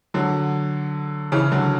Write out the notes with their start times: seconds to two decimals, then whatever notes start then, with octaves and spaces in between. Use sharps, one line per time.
0.14 D3 F#3
1.32 C#3 E3
1.52 D3 F#3